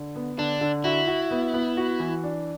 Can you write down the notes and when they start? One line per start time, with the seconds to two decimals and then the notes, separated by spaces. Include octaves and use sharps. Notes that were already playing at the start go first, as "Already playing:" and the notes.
Already playing: D3
0.16 B3
0.38 D3 D4
0.61 D3
0.84 E4 F#4
1.08 F#4
1.31 B3
1.54 B3
1.77 F#4
2.00 E3
2.24 D4